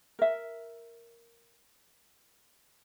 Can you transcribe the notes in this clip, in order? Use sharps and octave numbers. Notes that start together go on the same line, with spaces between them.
A#4 E5